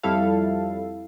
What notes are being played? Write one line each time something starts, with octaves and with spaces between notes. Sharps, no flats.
F2 G3 E4 A4 F5